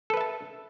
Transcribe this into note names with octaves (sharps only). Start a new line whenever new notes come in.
A4 B4 E5 A5